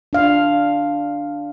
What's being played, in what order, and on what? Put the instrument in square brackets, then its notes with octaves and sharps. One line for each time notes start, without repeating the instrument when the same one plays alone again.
[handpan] D4 F5